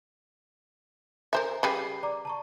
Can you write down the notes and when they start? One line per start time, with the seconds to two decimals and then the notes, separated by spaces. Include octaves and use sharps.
1.33 A#4 C5 E5 G#5 A#5 C6
1.63 C#3 G3 B4 C7
2.03 D5 A#5 D6
2.25 A5 A#5 C#6